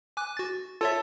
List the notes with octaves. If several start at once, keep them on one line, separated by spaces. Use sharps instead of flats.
G#5 D6 F#6
F#4 A6
F4 A4 C#5 E5